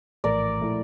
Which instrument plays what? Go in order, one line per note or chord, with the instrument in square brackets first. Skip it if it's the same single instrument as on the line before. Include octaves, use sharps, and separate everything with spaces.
[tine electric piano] A#1 A2 E3 A3 [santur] A#4 D5
[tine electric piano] A#2 F3 A3 E4